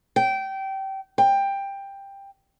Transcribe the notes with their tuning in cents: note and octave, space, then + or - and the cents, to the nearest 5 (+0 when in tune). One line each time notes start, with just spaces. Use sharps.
G5 -20
G5 +15